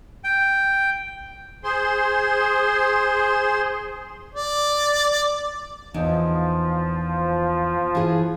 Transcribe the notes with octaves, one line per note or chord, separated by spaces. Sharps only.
G5
G#4 C5 C6
D5
E2 F3 D#4
E3 G#4